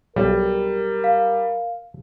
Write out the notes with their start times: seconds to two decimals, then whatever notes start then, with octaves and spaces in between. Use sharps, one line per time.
0.16 B1 G3 A#4
1.04 F5